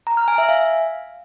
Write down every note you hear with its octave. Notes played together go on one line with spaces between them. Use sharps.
A#5
F6
G#5
E5
F5